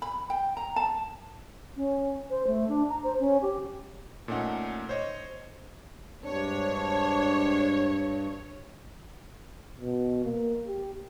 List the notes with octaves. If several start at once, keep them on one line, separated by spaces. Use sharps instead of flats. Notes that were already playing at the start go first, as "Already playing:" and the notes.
B5
G5
A#5
A5
C#4
C5
A3
D4
A#5
C5
C#4
G4
A#2 A3 C#4 D#4 F#5
C5 C#5 D#5
G2 G#3 C4 D4 C#5
B2
A#3
G4